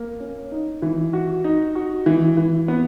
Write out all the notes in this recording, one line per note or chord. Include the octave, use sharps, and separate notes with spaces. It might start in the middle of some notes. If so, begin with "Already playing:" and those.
Already playing: A#3
C#4
D#4
E3
F#4
D#4
F#4
E3
E3
B3